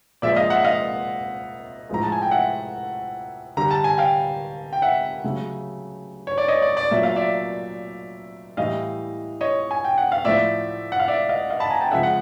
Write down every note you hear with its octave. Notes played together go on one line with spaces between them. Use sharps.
A#2 F3 G#3 D5 E5
D#5 F5
E5 F#5
D#5 F5
A2 F3 G#3 A#5
A5
G#5
G5
E5 F#5
D3 G3 A#5
A5
G#5
F5 G5
G5
E5 F#5
C#3 F#3 A3
C#5
D5
C#5 D#5
D5
D5
A#2 F#3 A3 E5
F5
D5 E5
A2 E3 G3 D#5 F5
C#5 D#5
G#5
G5
F#5
F5
A2 F3 A3 D5 E5
F#5
F5
D5 E5
D#5 F5
D#5 F5
A5 B5
G#5 A#5
G5 A5
C#3 F3 G#3 E5 F#5
F#5